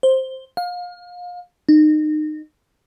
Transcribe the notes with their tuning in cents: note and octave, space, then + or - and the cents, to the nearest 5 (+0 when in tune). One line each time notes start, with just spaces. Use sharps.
C5 +5
F5 +30
D#4 -30